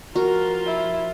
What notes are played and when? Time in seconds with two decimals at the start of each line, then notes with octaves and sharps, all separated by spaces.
0.16 F3 F4 F#4 A#4
0.66 E4